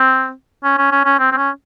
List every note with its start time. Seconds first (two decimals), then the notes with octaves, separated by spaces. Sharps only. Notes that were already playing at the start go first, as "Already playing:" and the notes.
Already playing: C4
0.64 C#4
0.78 C#4
0.92 C#4
1.05 C#4
1.19 C4
1.32 C4
1.37 C#4